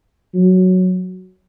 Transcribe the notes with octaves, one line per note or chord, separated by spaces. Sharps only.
F#3